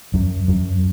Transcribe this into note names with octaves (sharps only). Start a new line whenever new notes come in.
F#2
F#2